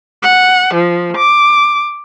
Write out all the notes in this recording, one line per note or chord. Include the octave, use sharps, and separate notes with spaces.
F#5
F3
D6